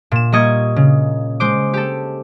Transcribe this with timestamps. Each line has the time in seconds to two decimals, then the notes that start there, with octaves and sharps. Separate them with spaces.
0.11 A#2 E7
0.32 G3 A#3 D#5 C#6 G#6
0.76 C#3
1.40 G#3 C5 D6
1.74 G4 A4